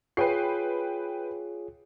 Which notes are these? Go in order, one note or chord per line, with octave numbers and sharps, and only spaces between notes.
F4 G#4 B4 C#5 G5 C7